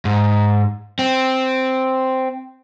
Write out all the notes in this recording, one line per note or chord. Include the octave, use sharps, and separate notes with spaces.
G#2
C4